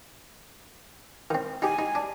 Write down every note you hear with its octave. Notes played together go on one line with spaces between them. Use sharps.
D#3 C4
D#4 G4 G#5
D#4
D4